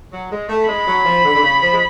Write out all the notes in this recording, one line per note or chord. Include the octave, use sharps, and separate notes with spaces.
F#3
G#3
A3
G#3 B5
F#3
F3
D3
D3
C#3
F3
G#3